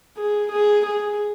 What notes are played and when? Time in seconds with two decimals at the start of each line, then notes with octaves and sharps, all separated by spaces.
0.18 G#4
0.52 G#4
0.86 G#4